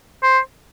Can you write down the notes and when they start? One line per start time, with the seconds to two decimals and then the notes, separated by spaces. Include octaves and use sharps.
0.23 C5